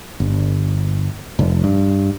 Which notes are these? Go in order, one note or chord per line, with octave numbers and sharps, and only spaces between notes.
G1
F1
G2